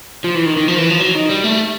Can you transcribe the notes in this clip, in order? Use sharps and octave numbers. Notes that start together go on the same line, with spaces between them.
F3
E3
D#3
D#3
F3
E3
F3
F#3
D#3
G3
A3